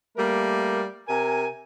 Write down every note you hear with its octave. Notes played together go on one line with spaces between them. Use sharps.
G3 A3 A#3 A#4
C3 A#4 G#5